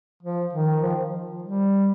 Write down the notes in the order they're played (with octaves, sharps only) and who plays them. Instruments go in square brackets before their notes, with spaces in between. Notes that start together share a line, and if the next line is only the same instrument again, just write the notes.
[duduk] F3
D#3
F3
G3